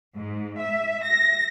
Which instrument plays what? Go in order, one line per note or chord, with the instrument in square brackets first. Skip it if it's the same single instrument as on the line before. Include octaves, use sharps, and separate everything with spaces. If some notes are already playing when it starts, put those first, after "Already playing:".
[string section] G#2
E5
A#6